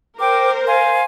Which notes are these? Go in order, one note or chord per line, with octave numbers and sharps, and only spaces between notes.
A#4 C5 G5 D6
F5 G#5 C6